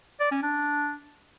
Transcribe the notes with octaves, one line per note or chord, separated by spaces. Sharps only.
D5
C#4
D4